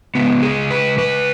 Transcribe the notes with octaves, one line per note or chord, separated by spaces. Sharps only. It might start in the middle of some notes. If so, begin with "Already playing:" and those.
C#3 G#3 B3
G#4
B4
B4